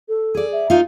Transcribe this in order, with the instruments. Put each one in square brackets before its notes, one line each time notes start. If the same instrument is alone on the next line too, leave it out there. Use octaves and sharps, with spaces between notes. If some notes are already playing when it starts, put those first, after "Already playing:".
[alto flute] A4
[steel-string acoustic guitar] G#4 D5
[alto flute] E5
[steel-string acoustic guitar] A#3 D#4 F4